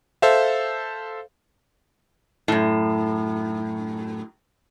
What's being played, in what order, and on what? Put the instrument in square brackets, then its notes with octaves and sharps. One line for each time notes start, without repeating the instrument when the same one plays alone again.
[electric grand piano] A4 C5 E5 F5
[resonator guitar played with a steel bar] F#2 A2